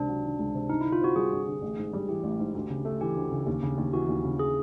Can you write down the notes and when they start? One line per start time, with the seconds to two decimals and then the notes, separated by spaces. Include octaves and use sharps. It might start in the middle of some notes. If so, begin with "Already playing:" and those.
Already playing: C#2 C3 D4
0.08 F#3
0.23 D#3
0.39 C#2
0.55 C3
0.70 G2 D#4
0.81 D3 E4
0.92 F4
1.01 C4 F#4
1.16 G3 G#4
1.32 G2
1.46 D3
1.62 A1
1.78 G#2
1.93 G3
2.08 E3 G4
2.24 A1
2.39 G#2
2.55 D2
2.70 C#3
2.85 A3
3.01 E3 G4
3.16 D2
3.32 C#3
3.47 D#2
3.63 C#3
3.78 D#2
3.94 E3 F#4
4.09 D#2
4.25 C#3
4.39 G#4